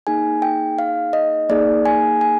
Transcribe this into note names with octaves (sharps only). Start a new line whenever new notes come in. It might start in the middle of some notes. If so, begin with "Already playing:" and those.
A#3 D#4 G#4 G#5
G5
F5
D#5
A#3 D#4 G#4 D5
G#5
G#5